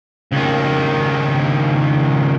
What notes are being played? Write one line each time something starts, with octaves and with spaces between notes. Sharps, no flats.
C#2 D#3